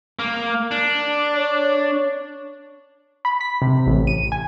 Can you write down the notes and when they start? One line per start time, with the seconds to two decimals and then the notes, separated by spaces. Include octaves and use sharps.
0.19 A#3
0.71 D4
1.36 C#5
3.25 B5
3.41 B6
3.62 C3
3.87 A1
4.07 D#7
4.32 G#5